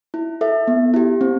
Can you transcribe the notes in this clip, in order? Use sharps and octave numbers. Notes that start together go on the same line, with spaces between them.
E4
A4 E5
B3
E4 G4
C4